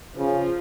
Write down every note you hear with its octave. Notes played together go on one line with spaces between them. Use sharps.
C#3 F3